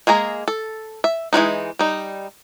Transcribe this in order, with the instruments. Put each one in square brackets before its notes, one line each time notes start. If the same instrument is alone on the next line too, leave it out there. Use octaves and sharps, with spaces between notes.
[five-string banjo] G#3 A#3 G#4 A#5
A4
E5
E3 F3 G#3 D#4
G3 D#4